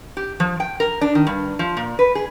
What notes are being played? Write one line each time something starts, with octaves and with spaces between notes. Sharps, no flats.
G4
F3
G5
A#4
D4
D#3
G2
F3
A#2
B4
G#4